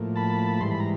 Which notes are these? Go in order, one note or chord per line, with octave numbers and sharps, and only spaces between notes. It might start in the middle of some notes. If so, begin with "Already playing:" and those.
Already playing: A2 F3 A#3
A5 B5
G#2 E3 G3 C6
B5
A#5